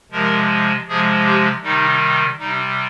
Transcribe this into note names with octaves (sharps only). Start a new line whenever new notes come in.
C3 F3 G#3 A#4
C3 F3 G#3 G#4
G4
C3 D#3 G3 D#4
C3 G3 D#4